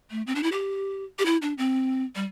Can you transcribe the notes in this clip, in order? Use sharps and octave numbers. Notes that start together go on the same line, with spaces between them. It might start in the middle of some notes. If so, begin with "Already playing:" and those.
A3
C4
D4
E4
G4
G4
E4
D4
C4
G3